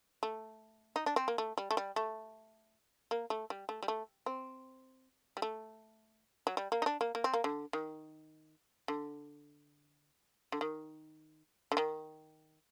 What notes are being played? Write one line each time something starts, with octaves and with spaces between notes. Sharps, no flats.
A3
D#4
D4
C4
A#3
A3
G3
A3
G3
A3
A#3
A3
G3
A3
G3
A3
C4
G3
A3
F#3
G3
A#3
D#4
D4
A#3
A#3
C4
A#3
D3
D#3
D3
D3
D#3
D3
D#3